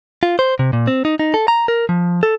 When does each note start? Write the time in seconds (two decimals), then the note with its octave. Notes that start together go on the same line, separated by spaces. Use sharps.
0.23 F4
0.39 C5
0.59 C3
0.73 A#2
0.87 C4
1.05 D#4
1.19 D#4
1.34 A4
1.48 A#5
1.68 A#4
1.89 F3
2.23 A4